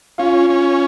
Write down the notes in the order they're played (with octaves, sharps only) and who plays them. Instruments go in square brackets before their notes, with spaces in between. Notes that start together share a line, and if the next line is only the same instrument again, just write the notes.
[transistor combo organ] C#4 [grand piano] F4
[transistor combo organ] C#4